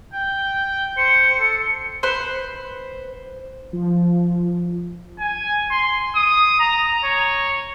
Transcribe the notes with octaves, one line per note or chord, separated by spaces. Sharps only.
G5
C5 C#7
A4
B4 C5
F3
G#5
C6
D#6
A#5
C#5